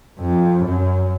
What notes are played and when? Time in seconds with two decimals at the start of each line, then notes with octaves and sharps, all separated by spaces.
0.20 F2
0.64 F#2